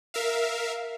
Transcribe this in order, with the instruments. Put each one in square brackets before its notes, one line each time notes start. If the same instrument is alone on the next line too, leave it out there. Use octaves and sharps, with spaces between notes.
[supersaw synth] A#4 E5 F5